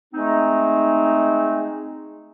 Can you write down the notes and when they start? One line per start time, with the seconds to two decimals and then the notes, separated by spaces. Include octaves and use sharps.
0.14 G#3 A3 C4 D#4